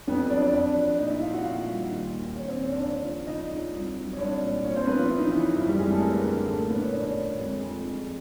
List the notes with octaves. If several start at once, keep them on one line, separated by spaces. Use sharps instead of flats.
F2 B3 B4
F#3 D4 D5
D4 D5
F2 D4 D5
F2
A#2 D#4 D#5
E4 E5
C4 F4 F5
F#4 F#5
A#2 F4 F5
G3
D#3
D#2
D#2 C#4 C#5
C4 C5
D#3 C#4 C#5
D4 D5
C#3 D4 D5
F3
C#3 D#4 D#5
F3
C2
F#3
C#5
C2 D4 D5
A#2
A#3 C#4 C#5
C4 C5
A#3 B3 B4
F3 F4
A#3 E4
D#4
E3 E4
C#3
F#2 E3 E4
G3 G4
G#3 C4 G#4
A3 A4
G3 A#4
B4
A#3 A#4
D3
A2 A3 A4
A#3 A#4
A#1 B3 B4
C#4 C#5
A2 D4 D5
A2
F2 G#3 G#4
F2
F3